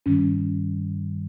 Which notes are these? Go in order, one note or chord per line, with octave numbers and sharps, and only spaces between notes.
G2 D#3 G3 C#4